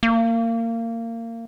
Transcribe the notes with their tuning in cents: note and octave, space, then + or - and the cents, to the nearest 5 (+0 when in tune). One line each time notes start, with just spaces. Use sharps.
A#3 -25